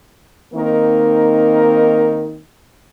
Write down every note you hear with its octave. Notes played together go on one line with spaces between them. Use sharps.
D#3 A#3 C4 D#4 A#4